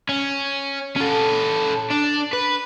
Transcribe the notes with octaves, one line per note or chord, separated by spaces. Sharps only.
C#4
C#4 A4
D4
B4